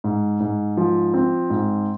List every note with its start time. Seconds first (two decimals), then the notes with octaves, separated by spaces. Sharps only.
0.04 G#2
0.40 G#2
0.77 F3
1.14 C4
1.50 G#2